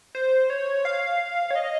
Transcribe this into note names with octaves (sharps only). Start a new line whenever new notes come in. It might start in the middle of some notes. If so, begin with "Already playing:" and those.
C5
C#5
F5
C#5
D#5